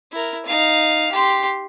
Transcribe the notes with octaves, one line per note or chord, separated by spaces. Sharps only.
E4 A#4
D#4 F5
G4 C6